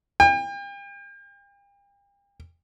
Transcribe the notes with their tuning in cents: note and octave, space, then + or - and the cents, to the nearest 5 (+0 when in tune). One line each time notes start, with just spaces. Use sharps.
G5 +40